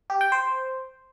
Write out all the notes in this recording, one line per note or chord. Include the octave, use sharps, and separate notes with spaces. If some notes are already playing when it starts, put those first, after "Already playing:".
G4
G5
C5